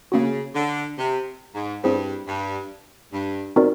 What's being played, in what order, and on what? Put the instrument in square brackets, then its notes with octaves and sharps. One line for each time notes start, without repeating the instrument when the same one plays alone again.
[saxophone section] C#3 [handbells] A#3 C#4 F#4
[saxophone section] D3
C3
G#2
[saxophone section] G2 [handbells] C4 E4 G#4 C5
[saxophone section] G2
G2
[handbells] C4 D#4 F#4 A#4 D5